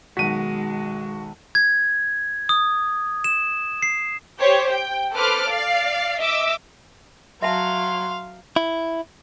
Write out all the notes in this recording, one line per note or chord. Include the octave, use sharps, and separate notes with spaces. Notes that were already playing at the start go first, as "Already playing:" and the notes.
B1 D#3 G#3 F#4 B6 D#7
G#6
D#6
E7
C7
G4 C5 C#5
G5
A4 B4 C5 D6 F6
D5 F5
D#5 E5 D6 E6
F#3 E5 F5 A5 C6
E4